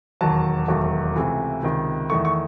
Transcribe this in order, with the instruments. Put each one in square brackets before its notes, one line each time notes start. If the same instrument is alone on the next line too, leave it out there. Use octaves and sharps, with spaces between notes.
[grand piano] E1 D#2 D#3 F#3 A5
E1 D#2 D#3 F#3 A3
C#2 C3 E3 A3
C#2 C3 D#3
E2 D#3 A3 C#6
C#6